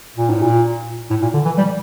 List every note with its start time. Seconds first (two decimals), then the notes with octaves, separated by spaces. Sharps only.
0.17 A#2
0.30 A2
0.42 A#2
1.10 A2
1.22 A#2
1.34 D3
1.45 E3
1.58 G3